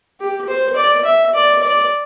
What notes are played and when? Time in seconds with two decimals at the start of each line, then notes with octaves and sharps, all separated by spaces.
0.20 G4
0.48 C5
0.76 D5
1.05 E5
1.34 D5
1.63 D5